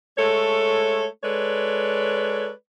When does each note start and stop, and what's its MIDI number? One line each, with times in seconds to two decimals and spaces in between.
0.18 1.07 56
0.18 1.07 57
0.18 1.07 69
0.18 1.07 73
1.24 2.51 56
1.24 2.51 69
1.24 2.51 71
1.24 2.51 73
1.24 2.51 74